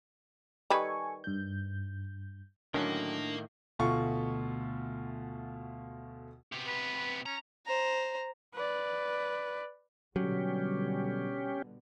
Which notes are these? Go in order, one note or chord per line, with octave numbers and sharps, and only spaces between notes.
D#3 G3 A4 B4 G#5 C#6
G2 G6
A2 D3 D#3 F#3 C#4 D4 A#4 F5
D2 B2 A3 F4 C#6
C3 B3
B4
C#4 A#5
C5 A#5
B4 D5
B2 D3 F#3 G3 C#4 G4